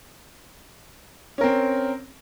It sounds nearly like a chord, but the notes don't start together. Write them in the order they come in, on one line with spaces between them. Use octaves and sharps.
C#4 A#4 C4